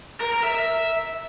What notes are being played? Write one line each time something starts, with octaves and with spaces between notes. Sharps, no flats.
A#4
A#4
E5
E5